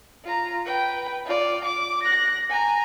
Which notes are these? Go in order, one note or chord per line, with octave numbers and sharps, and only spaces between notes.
F4 A#5
B4 G5
F4 D5
D6
F#6 A#6
G#5 A#5